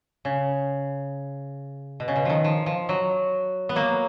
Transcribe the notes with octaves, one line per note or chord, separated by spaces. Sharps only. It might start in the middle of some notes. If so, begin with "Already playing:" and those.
C#3
B2
C#3
B2
D#3 F3
F3
F3
F#3
B3
F#3 A#3